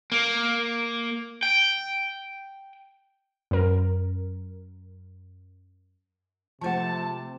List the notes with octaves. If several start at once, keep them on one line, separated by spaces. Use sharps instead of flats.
A#3
G5
F#2 A#4
C3 F3 A3 F4 C5 F#5 A5